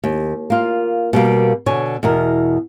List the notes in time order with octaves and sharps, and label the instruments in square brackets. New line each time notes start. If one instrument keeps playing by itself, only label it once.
[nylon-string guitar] D#2
A#3 F4
B2 G3 A#3
B2 D3 C#5 G#5
E2 B2 A#4